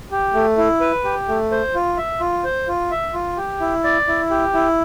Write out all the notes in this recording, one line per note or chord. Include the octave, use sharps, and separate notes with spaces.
G4
A3
E4
B4
G4
A3
C5
F4
E5
F4
C5
F4
E5
F4
G4
E4
D5
E4
G4
E4